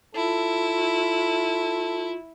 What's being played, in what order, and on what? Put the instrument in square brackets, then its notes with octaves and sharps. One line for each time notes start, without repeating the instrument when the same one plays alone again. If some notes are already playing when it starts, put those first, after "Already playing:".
[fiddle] E4 [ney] F4 [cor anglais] A4